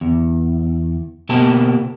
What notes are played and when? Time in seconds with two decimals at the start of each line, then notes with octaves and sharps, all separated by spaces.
0.01 E2
1.29 B2 A#3 G4 A5